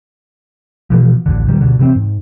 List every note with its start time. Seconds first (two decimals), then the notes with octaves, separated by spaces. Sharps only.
0.90 B2 E3 F3
1.26 A1 D2 D3
1.48 A#2 D#3 G3
1.61 D2 B2 D3
1.79 C3 E3 B3 C4
1.96 G#2